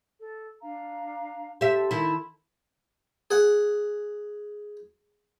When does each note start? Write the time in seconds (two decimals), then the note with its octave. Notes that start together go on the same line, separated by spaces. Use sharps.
0.18 A4
0.62 D4 F5 A#5
1.61 G4 A4 E5 A5 C6
1.91 D#3 E4
3.31 G#4 F#5